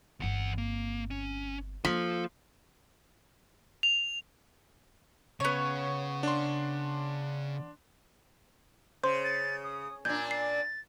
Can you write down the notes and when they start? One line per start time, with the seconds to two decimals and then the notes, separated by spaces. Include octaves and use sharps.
0.20 G1 E2 C4 F#5
0.58 A#3
1.11 C#4
1.85 F3 A#3 A4
3.83 F7
5.40 C#3 B3 C#5
6.23 D4 C6
9.04 C#3 C5 C6
9.24 A6
9.64 D#6
10.05 A#2 D4 G6 G#6
10.31 A6 C7